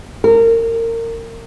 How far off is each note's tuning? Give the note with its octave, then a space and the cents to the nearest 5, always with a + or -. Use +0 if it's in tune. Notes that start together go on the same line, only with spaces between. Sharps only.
A#4 -25